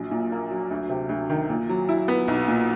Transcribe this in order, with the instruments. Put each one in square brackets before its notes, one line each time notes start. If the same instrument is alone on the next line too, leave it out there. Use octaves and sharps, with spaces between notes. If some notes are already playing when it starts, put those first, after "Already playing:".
Already playing: [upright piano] A#1 F#3
A#2
A#3
F#3
D2
C3
D2
D#3
A#2
F#3
E4
B3
B1
A#2